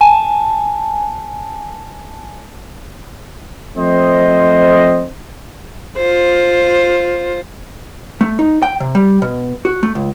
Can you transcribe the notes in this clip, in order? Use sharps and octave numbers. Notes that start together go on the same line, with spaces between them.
G#5 A5
F3 A3 C4 C5 D#5
F4 C5
A3
D#4
G5
C3
G3
B2
F#4
A3
C#2